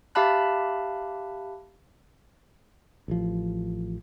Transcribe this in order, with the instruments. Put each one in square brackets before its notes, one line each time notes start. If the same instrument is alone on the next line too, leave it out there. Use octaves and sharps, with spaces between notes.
[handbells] G4 E5 F5 A5 B5 F#6
[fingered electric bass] A1 F3